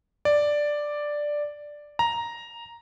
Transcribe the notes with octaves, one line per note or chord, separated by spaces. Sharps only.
D5
A#5